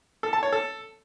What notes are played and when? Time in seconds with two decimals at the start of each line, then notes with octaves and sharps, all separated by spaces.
0.23 A4
0.33 A5
0.43 C#5
0.52 A4